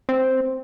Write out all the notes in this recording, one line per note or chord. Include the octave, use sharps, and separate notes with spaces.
C4